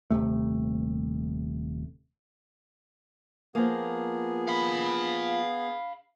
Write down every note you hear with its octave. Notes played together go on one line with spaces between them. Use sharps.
D#1 F2 C3 A3
F3 A#3 B3 G#4
F5 B5